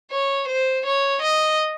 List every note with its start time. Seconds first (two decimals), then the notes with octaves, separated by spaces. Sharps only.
0.11 C#5
0.48 C5
0.86 C#5
1.22 D#5